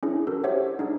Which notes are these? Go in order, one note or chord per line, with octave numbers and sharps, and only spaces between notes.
C#4 D4 E4 G#4
F#4 A4 A#4
G4 C5 C#5 E5 F#5
D4 D#4 G#4